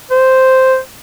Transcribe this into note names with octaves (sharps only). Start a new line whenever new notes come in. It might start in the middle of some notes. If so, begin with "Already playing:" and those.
C5